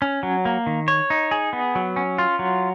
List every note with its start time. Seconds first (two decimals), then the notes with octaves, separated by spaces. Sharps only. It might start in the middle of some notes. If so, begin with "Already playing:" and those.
0.02 C#4
0.23 F#3
0.45 A#3
0.67 D#3
0.88 C#5
1.10 D#4
1.31 G#4
1.53 B3
1.75 F#3
1.96 C#4
2.18 F4
2.39 F#3